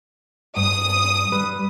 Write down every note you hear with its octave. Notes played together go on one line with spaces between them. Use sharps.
G2 D#6
G3 B4 B5